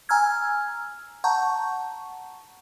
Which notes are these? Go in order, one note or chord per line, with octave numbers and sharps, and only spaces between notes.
G#5 A#5 E6 F6 G#6
F#5 A5 A#5 C#6 G6